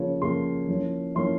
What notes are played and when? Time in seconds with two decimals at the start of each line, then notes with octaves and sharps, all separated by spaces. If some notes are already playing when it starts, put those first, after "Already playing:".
Already playing: C#3 F3 A#3 F4 C#5
0.21 C#3 F3 A#3 F4 C6
0.68 F3 A#3 C#4 E4
1.15 F3 A#3 C#4 E4 C6